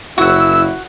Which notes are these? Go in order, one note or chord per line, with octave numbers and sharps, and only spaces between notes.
F#1 E4 F#4 F#5 E6